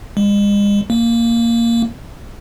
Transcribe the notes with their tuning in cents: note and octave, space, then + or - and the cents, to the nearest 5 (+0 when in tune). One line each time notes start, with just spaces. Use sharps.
G#3 -40
A#3 -5